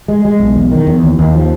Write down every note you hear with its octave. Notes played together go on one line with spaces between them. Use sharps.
G#3
G#3
B1
E2
D#3
E2
D#2
D#2
F3